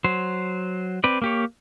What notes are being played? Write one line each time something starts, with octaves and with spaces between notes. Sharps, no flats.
F#3 C5
C4 B4 D5
A#3 G4 C#5